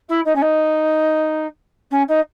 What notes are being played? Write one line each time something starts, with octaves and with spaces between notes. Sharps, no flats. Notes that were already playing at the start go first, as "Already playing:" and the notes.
E4
D#4
C#4
D#4
C#4
D#4